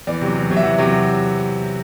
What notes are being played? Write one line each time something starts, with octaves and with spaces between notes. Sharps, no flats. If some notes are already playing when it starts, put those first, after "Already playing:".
E2 D5
C3 F#3
E2
C3 F#3
E5
E2 F#5
C3 F#3